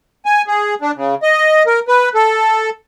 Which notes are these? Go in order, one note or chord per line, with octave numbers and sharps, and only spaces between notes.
G#5
G#4
D4
C#3
D#5
A#4
B4
A4